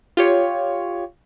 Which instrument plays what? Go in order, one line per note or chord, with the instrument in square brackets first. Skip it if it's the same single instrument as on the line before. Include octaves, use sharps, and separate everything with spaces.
[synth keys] F4 G4 C#5